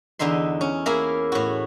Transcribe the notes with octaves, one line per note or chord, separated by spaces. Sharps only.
E2 D3 D#4 E5 C6
C#4
A#3 E4 G#4 A#4 E5
A2 F#4